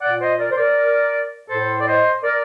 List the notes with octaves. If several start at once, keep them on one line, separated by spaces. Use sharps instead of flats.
A#2 D5 F#5
C5 D#5
A#4 D5
C5
A#4 D5
A2 A4 C5
D5
C5 D#5
A#4 D5